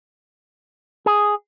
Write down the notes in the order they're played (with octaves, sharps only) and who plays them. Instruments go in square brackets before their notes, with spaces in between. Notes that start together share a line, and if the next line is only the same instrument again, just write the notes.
[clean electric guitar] G#4